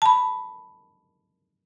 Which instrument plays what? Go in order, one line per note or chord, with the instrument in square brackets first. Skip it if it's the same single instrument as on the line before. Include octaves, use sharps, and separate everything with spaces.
[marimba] A5 B5